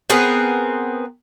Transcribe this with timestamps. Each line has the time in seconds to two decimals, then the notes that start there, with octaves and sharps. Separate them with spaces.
0.10 B3 C4 G#4 A#4